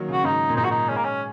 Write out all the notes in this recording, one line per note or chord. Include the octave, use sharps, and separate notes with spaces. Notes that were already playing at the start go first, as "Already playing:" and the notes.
Already playing: D#3 F#3 A#3
C#3 F#4
G#2 D#4
A#2
G#2 D#4
F#4
D#4
G#3 C#4
A#3
C#4